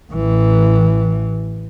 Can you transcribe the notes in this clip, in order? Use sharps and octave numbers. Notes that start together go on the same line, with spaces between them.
A1 E3